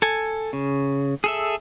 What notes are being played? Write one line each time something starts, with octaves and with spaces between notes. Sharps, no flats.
A4 G#5
C#3
G#4 A4 E5